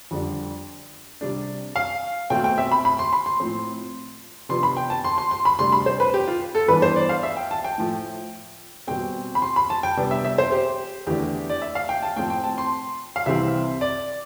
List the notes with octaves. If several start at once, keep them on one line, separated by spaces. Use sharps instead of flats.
F2 D3 G3 D4
C3 G3 D4
F5
B2 A3 C4 G5
G5
E5
B5
B5
C6
B5
C6
A2 F3 C4
C3 F3 B3 D4 C6
B5
G5
A5
C6
C6
C6
B5
D2 C3 G3 D4 C6
B5
C5
B4
G4
F4
A4
G2 E3 B3 D4 B4
C5
D5
F5
E5
G5
A5
G5
A2 F3 A3
B2 G3 C4 G5
B5
C6
B5
A5
G5
C3 G3 B3 D4
E5
E5
C5
G4
E2 D3 A3 D4 G4
D5
E5
F5
G5
A5
A2 F3 C4 G5
G5
A5
C6
F5
C2 C3 E3 G3 C4 E5
D5